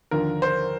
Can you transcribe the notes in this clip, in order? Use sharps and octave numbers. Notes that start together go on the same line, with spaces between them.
D#2 D3 F3 A#4
C5